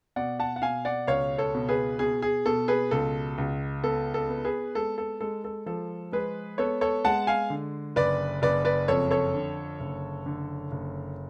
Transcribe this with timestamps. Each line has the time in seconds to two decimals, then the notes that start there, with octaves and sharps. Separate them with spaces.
0.16 B2 D5 F#5
0.39 F#5 A5
0.56 F#5
0.62 B2 F5 G#5
0.85 D5 F#5
1.07 C#2 C#5 F5
1.38 A4 C#5
1.54 B2
1.69 G#4 B4
1.99 B2 G#4
2.22 G#4
2.46 B2 A4
2.68 G#4 B4
2.91 C#2 A4
3.38 C#2
3.83 B3 A4
4.14 A4
4.29 B3
4.44 G#4 B4
4.75 G#3 A4
4.98 A4
5.21 G#3 A4
5.44 A4
5.66 F3 A4
6.12 G#3 G#4 B4
6.58 B3 A4 C#5
6.81 A4 C#5
7.05 G#3 F#5 A5
7.27 F5 G#5
7.50 D3
7.96 F#1 B4 D5
8.42 F#1 B4 D5
8.65 B4 D5
8.88 F2 A4 C#5
9.11 A4 C#5
9.34 D3
9.80 F#1
10.26 D3
10.71 F#1